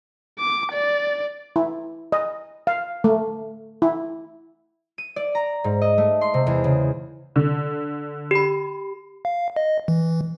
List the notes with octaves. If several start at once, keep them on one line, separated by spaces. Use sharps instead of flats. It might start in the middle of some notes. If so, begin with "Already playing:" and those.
D6
D5
E4
D#5
F5
A3
E4
D#7
D5
A#5
G#2
D#5
A3
C6
C3
E2
C#3
D3
G4 B5
F5
D#5
E3